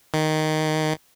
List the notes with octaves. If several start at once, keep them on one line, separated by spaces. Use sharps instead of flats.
D#3